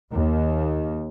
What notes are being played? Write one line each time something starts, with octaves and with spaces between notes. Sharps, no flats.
D#2